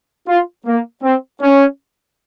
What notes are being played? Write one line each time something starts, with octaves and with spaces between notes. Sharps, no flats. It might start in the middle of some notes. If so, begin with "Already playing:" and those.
F4
A#3
C4
C#4